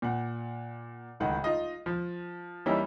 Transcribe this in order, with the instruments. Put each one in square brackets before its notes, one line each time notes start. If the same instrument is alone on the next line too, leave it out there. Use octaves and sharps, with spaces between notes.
[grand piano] A#2 F#5
D1 C#2 D#3 F#5
D#4 F4 D#5
F3
E3 G3 A#3 C#4 D#4 E4